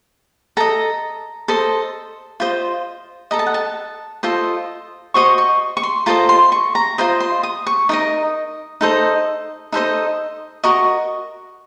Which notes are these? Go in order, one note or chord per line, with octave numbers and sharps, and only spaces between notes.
A4 D#5 A#5
A4 C5 D#5
F4 C5 D#5
A4 D#5 A#5
A5
F#5
A5
F4 A4 C5 D#5
F#4 C5 D#5 C#6
C#6
C#6
C6
F4 A4 C5 D#5 A#5
C6
C#6
A#5
F4 C5 D#5
C6
D#6
C#6
D#4 A#4 D#5 D#6
D#4 A4 C5 D#5
D#4 A4 C5 D#5
F#4 A#4 D#5 C#6